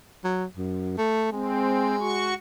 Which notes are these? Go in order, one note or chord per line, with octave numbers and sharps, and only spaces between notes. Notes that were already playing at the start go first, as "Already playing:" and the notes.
F#3
F#2
A3
G#3 C4
F#4 C#6